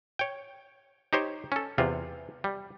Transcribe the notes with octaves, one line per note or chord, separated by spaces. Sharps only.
C#5 G5
D#4 G4 C5 C#5
C#4 A4
E2 C3 F4
G3